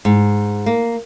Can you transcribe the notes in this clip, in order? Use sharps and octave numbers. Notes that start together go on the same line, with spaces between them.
G#2
A#3